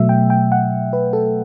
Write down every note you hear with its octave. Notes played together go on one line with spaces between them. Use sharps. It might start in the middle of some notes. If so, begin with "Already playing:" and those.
Already playing: B2 F#3 A3 E5
G5
G5
F#5
B4
A4